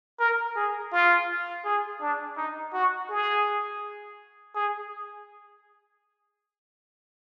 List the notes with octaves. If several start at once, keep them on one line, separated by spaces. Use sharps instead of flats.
A#4
G#4
F4
G#4
D4
D#4
F#4
G#4
G#4